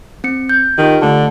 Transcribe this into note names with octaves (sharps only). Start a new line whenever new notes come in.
C4 C#7
G6
D#3 F4 G4
D3 A3 A5